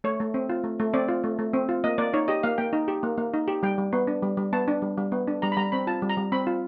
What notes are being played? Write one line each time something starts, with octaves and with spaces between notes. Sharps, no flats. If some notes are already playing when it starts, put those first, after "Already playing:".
A3 C#5
A3
C4
F4
A3
A3
C4 D5
F4
A3
A3
C4
F4
A#3 D#5
A#3 D5
D#4 C#5
G4 D#5
A#3 F5
A#3 G5
D#4
G4
A#3
A#3
D#4
G4
G3 G5
G3
B3
D4
G3
G3
B3 A5
D4
G3
G3
B3
D4
G3 A#5
B5
G3 A#5
C4 B5
F4 A5
G3
A#5
G3
C4 B5
F4